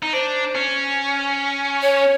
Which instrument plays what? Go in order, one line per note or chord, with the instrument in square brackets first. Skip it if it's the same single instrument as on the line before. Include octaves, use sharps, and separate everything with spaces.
[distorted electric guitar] D#4
[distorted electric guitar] D4 [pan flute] C5
[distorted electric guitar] C#4
[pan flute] C#5